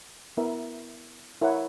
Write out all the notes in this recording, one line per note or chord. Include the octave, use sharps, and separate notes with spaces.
B3 E4 A#4 E5
E4 A#4 C#5 F#5